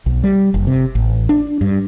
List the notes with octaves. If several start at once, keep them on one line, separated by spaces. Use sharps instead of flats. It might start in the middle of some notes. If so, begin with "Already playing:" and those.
B1
G3
F#1
C3
A1
D4
G2